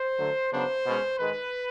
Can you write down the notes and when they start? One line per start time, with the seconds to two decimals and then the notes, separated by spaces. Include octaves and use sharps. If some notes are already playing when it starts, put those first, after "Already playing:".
Already playing: C5
0.19 D3 F#3 A3
0.53 C#3 F#3 B3 D4 C5
0.86 B2 G#3 C#4
1.19 G#2 D#3 G#3 B4